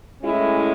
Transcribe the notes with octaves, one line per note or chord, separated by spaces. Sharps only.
A2 G#3 C#4 E4